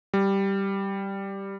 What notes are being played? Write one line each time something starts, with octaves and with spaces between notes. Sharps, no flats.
G3